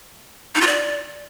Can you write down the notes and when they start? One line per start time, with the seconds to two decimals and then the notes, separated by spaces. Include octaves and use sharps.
0.55 D#4
0.61 F4
0.67 D5